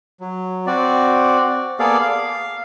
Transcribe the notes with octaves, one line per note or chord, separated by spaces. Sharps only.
F#3
C4 F#4 D5
A#3 B3 G#4 A4 D5 F5
F5